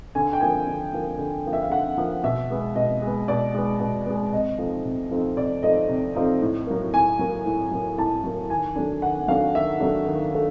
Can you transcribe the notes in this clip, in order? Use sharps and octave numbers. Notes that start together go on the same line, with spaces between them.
D3 G#5
G5
F3 A#3 G#5
D3
F3 A#3
D3
F3 A#3
E5
F5
D3 F#5
F3 A#3
B2 E5
G#3 B3
B2 D#5
G#3 B3
B2 D5
G#3 B3
B2
G#3 B3
C3 D#5
F3 A3 C4 D#4
C3
F3 A3 C4 D#4
C3 D5
F3 A3 C4 D#4 D#5
C3
F3 A3 C4 D#4
A2
F#3 A#3
A2 G#5
F#3 A#3
A2
F#3 A#3
A2 A5
F#3 A#3
D#3 G#5
F#3 A3 D4
D#3 F#5
F#3 A3 D4 F5
D#3 E5
F#3 A3 D4
D#3
A3 D4